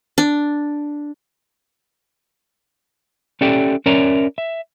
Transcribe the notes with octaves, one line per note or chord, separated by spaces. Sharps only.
D4
C#4 G4 A4 D5 E5 G5
C#4 A#4 C#5 D5 E5 A#5
E5